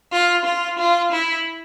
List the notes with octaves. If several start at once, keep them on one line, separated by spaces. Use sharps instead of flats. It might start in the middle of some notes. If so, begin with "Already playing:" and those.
F4
F4
F4
E4